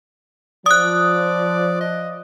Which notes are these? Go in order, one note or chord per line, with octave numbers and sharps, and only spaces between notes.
F3 D5 D#6 F#6
D#5